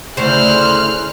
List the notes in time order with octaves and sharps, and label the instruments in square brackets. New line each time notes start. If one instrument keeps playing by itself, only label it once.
[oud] D2 C#3 [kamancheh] E4 G#4 [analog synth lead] C5 [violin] F6 F#6